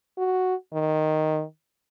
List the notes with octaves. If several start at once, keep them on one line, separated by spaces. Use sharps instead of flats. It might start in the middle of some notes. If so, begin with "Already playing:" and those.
F#4
D#3